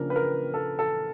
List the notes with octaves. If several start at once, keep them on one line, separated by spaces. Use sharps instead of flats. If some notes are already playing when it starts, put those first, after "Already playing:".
Already playing: C#3 F3 A#3 D4 A#4
B4
A#4
A4
A4